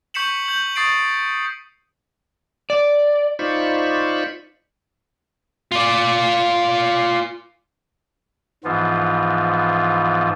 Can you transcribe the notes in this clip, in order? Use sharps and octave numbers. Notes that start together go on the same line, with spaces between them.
C#6 G6 B6 C#7 E7 F#7
G6 F#7
C#6 D#6 A6 C7 D7
D5
D#4 F4 C5 D5 B5 C#6
F4 D5
G#2 E3 F3 B3 F4